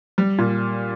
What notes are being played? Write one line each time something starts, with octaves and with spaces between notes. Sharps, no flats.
G3
A#2